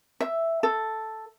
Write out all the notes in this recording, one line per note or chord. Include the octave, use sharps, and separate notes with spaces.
E5
A4